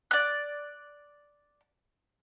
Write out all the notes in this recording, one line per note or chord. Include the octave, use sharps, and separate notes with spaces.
D5 F#6